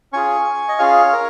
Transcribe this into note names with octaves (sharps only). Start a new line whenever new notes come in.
C#4 F4 G#4 G#5 C#6
D#5
C#4 F4 G#4 C#5 F5
A#4